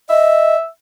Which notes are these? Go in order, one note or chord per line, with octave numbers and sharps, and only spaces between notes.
D#5 E5